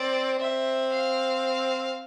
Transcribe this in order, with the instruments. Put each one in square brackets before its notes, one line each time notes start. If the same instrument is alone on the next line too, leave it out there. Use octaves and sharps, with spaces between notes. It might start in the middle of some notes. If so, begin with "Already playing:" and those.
Already playing: [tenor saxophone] C4 [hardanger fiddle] D5
[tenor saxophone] C4 [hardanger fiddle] E5
[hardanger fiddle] F5